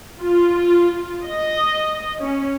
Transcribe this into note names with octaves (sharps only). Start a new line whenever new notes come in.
F4
D#5
C#4